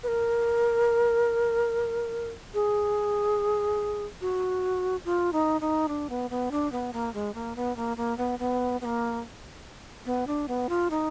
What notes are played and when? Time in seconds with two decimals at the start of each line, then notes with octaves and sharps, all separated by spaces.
0.03 B4
0.08 A#4
2.54 G#4
4.21 F#4
5.05 F4
5.33 D#4
5.61 D#4
5.88 D4
6.10 B3
6.30 B3
6.51 D4
6.72 B3
6.93 A#3
7.14 G#3
7.35 A#3
7.56 B3
7.76 A#3
7.97 A#3
8.18 B3
8.39 B3
8.81 B3
8.85 A#3
10.06 B3
10.27 D4
10.48 B3
10.69 F4
10.91 D#4